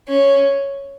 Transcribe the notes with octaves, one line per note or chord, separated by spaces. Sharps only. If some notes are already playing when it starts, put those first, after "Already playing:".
C#4